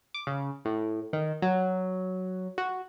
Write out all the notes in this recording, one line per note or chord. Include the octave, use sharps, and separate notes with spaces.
D6
C#3
A2
D#3
F#3
F#4